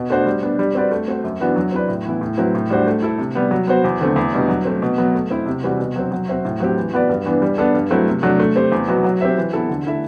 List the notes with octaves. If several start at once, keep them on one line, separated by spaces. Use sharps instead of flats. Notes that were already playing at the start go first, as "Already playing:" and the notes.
Already playing: B2
A3 D4 F#4 C5
G3
B3 D4
G3
C4 F#4 B4 D5
A3
C4 F#4 C5
F#2
E3 B3 D4 F#4
F#3
C4 E4 B4 D5
A2
E3 B3 E4
A2
F#3 C4 E4 B4
A2
G3 D4 F#4 C5
A3
E4 A4
C3
G3 B3
F#3
B3 F#4 C5
E2
D3 A3 C4
E2
B2 G3 D4
F#3
A3 C4
B2
F#3 B3
A3
C4 E4
C3
E3 G3 C4 F#4
B2
F#3 C4
F#3
C4 F#4 C5 E5
A2
F#3 C4 G4
E3
B3 F#4 B4 D5
G2
E3 B3 D4
G3
B3 D4 A4
G2
F#3 A3 C4 E4
C3
F#3 A3 D4
A3
C4 G4 C5
E2
B2 F#3 B3 F#4
F#3
C4 G4 C5 E5
E3
B3 E4 A4
D3
A3 E4 A4 E5